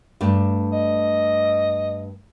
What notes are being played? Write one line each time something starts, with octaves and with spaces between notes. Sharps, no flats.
G2 A3 D4
D#5